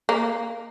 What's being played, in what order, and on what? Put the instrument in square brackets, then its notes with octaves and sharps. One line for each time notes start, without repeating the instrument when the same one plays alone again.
[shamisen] A#3